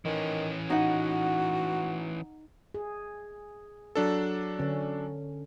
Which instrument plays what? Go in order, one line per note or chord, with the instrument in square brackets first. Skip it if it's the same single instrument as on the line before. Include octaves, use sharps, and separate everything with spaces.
[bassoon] D#3 [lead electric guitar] E3 C#4
[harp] D#4 F#5 [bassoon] F#4
[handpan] G#4
[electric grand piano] F#3 D4 A4
[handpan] D3 C#4